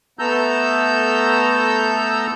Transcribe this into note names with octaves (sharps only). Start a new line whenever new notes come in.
A3 B3 A4 A#5 E6 G6